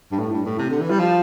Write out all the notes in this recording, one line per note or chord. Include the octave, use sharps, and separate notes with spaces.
G2
A2
G2
A2
C3
D3
E3
G3
F3